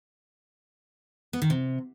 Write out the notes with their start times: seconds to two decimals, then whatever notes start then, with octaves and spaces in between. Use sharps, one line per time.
1.33 B3
1.42 D#3
1.50 C3